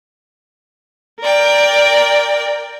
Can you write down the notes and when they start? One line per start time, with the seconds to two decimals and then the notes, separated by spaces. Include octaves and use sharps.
1.21 A#4 D5 G5